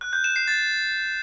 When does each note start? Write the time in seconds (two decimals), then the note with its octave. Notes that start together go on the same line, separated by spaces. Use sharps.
0.01 F#6
0.13 G6
0.24 E7
0.36 C7
0.47 A6